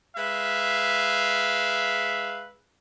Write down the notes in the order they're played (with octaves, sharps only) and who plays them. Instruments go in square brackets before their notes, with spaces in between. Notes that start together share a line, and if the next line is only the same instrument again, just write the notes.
[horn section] G#3 B4 E5 F5